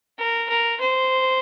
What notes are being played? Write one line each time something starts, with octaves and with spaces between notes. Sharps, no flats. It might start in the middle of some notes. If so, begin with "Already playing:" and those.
A#4
A#4
C5